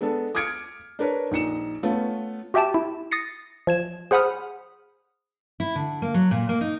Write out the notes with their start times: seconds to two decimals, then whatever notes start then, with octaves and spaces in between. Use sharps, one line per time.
0.01 G#3 B3 D4 A4
0.35 D6 D#6 F6 G#6 C#7 D7
0.99 D4 A#4 B4 C#5
1.31 A#1 D#4 C#7 E7
1.83 A3 B3 C#4 F4
2.54 F#4 G4 E5 G5 A5 E7
2.74 E4
3.11 D#6 A6 A#6 C7 C#7
3.67 F3 G#6 E7
4.11 G#4 C5 F#5 B5 D#6 F6
5.60 E4
5.76 D3
6.02 A#3
6.14 F#3
6.31 A#2
6.49 A#3
6.61 D#4